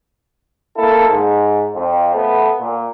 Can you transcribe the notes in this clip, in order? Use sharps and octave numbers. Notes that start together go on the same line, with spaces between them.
A#3 E4 A4
G#2
F2
A3 B3
A#2